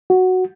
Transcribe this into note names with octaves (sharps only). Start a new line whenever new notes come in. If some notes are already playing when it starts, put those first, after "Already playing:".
F#4